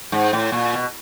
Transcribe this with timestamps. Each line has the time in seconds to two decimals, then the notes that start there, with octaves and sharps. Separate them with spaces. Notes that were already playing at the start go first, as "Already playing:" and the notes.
0.12 G#2
0.33 A2
0.52 A#2
0.73 B2